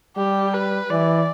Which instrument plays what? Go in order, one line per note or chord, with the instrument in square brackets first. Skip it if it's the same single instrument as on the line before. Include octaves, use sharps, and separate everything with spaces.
[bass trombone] G3 [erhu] G4
[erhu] B4
[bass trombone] E3 [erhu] D5